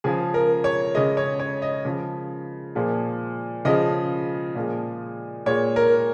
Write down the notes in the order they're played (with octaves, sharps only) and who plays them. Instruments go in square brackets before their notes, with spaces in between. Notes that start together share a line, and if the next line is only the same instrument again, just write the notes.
[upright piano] C#3 F3 G#3 G#4
A#4
C#5
C#3 G#3 D#5
C#5
C#5
D#5
C#3 F3 G#3
A#2 F3 G#3
C#3 F3 G#3 D#5
A#2 F3 G#3
A#2 G#3 C#5
A#4